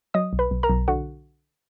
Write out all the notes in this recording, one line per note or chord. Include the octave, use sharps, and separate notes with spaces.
F#3 D#5 D#6
B1
B4 B5
B1
A#4 A#5
B1
D3 F#4 F#5